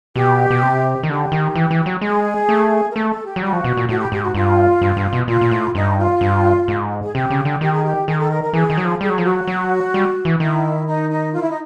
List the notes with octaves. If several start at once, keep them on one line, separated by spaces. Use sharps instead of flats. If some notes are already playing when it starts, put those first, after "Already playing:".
B2 G4
B2
C3
D#3
D3 G4
D#3
E3
E3
F#3
G#3 G#4
A3
A#4
A3 A4
A4
G4
F#3
G3 F#4
F3
B2
A#2
A2 F#4
G4
G#2 G4
F#4
G2 F4
G2
G2
B2
A#2 F4
A#2
A2
G2 D#4
F4
G2
G#2
G#4
C3 G4
C#3
D3
D#3 G4
G#4
G4
D#3 G#4
A4
A#4
A#4
E3 G#4
D#3
F#3
F3
G3 G#4
F#3
F3
F#3 F#4
F#3
G3
E3
D#3 E4
D#4
D#4
F4
E4
D#4